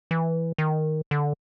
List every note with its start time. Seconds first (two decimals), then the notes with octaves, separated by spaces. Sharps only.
0.11 E3
0.58 D#3
1.11 D3